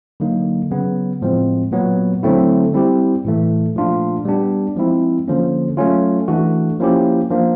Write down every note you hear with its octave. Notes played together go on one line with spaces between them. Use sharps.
D3 F#3 A#3 D#4
C#3 F#3 B3
A2 F3 G#3 C4
A#2 F#3 B3
D3 F#3 A3 C4 E4
G3 C4 E4 G4
A2 E3 A3
A#2 F3 A3 D4 F4
G3 B3 D4 G4
F3 G#3 C4 E4
D3 F3 A#3 C#4
F#3 A3 C#4 F4
E3 A3 D4 F#4
F3 A#3 C#4 E4 G4
F3 A#3 D4